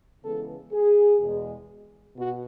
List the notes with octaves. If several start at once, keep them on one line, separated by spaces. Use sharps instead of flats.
C#3 E3 G#3 B3 A4
G#4
E2 B2 G#3
B2 F#4